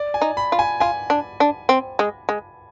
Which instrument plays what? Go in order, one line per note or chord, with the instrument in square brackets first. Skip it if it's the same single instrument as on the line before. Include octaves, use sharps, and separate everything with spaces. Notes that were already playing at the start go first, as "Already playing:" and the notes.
Already playing: [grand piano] D5
G#5
[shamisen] D#4
[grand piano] B5
[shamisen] F4
[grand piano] G#5
[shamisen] F4 [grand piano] G#5
[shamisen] D4
D4
C4
G#3
G#3